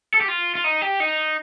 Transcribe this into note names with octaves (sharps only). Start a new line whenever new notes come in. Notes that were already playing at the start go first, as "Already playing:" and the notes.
A4
G4
F4
F4
D#4
G4
D#4